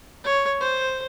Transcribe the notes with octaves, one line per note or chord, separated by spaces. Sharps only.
C#5
C5